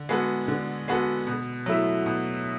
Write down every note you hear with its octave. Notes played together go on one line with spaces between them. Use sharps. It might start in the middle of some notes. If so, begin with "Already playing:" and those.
Already playing: D3
G#3 B3 F#4 A4
D3
G#3 B3 F#4 A4
B2
F#3 A3 E4
B2